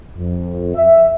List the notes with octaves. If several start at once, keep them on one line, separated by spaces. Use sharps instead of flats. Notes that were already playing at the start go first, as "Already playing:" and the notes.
F2
E5